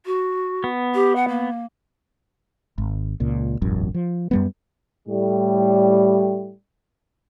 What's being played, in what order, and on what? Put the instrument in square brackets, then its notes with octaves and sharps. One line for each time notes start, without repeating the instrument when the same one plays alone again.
[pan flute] F#4
[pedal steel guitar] B3
[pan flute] G4
F#5
A#3
[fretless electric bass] G#1
C#2 A#2
E1 A1 F#2
F3
F#2 G3 B3
[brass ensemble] A2 G3